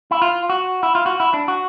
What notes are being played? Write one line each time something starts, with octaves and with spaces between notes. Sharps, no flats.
E4
F4
F#4
E4
F4
F#4
E4
D4
F#4